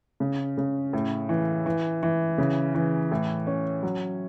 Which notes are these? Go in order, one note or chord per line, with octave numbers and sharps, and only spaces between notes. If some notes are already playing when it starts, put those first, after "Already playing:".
C#3
C#3
A2
E3
E3
E3
C#3
E3
A2
C#4
F#3